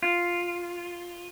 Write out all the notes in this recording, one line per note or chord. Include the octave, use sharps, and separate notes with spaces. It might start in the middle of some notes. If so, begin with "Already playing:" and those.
F4